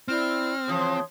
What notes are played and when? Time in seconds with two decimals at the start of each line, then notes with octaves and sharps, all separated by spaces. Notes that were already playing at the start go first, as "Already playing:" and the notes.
0.08 C4 E4 D5 F6
0.67 C#3 E3 F3 C#5 C6 D#6